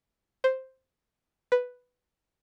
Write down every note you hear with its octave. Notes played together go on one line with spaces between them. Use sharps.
C5
B4